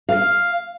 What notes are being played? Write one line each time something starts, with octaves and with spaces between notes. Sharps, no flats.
F5